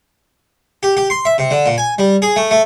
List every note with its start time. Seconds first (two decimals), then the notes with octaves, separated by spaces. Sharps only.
0.83 G4
0.97 G4
1.10 C6
1.25 E5
1.38 C3
1.51 D3
1.66 A#2
1.78 G#5
1.99 G3
2.22 G#4
2.36 A3
2.51 A3